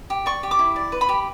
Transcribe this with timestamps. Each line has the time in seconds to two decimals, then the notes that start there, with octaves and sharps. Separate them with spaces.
0.10 G4
0.26 D5 C#6
0.43 G4
0.51 D6
0.59 E4
0.76 D5
0.92 B4
1.01 B5
1.09 G4